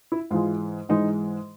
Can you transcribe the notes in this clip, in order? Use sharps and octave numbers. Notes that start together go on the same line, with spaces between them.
E4
G#2 E3 G#3 F4
G#2 E3 G#3 D#4